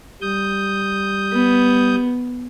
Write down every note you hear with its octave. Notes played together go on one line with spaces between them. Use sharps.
G3 D#6 G6
B3